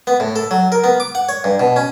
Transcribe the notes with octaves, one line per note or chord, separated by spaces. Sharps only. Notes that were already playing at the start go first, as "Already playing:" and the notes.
B3
A2
A4
F#3
A#4
B3
D6
F#5
C#5
G2
B2
C#4